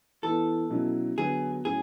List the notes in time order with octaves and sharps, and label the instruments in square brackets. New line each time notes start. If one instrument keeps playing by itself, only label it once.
[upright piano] E3 B3 E4 [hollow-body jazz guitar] A4
[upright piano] B2 F#3 C#4 E4
[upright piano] D3 F#3 B3 [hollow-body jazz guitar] G#4
[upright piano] A2 F#3 C#4 [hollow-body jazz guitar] G#4